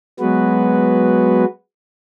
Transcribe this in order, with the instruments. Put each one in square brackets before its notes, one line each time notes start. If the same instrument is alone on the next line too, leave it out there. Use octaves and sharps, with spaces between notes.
[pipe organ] F#3 G#3 B3 F#4 B4